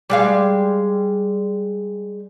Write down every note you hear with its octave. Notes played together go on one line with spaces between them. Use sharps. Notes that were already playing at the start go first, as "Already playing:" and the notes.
G3 G#3 F5